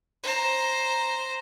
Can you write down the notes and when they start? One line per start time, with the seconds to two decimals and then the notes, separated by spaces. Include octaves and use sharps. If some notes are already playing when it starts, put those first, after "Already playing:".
0.24 C5 A#5